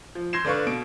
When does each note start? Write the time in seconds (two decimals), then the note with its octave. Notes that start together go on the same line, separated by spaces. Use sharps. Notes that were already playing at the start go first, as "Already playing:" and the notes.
0.15 F3
0.33 C6 G6 G#6 A#6 C7 E7
0.45 D3 D4 B4 F5 C#6
0.67 B2 D7